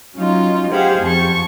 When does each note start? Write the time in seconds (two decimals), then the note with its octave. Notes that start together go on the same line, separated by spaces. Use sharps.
0.14 F#3 C#4 D#4 F4
0.70 G4 G#4 C5 F5 F#5
1.01 F2 A5 C#6